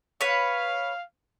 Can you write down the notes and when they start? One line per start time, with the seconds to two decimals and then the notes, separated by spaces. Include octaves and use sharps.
0.21 B4 C#5 F5